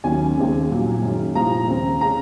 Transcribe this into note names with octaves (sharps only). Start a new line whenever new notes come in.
D#2 D#3 F#3 A#3 C#4 G#5
D#2 C#3 G#3 C4
C2 A#2 F#3
F#2 D#3 G#3 C#4
C2 A#2 F3 A#5
D#2 C#3 G#3 C4
C#3 G#3 C#4 A#5